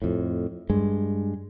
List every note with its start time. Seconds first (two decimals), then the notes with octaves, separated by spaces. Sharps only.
0.02 F2 A2
0.70 G2 G#3